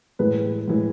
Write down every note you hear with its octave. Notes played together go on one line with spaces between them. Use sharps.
A2 E3 G#3 B4
A2 E3 G#3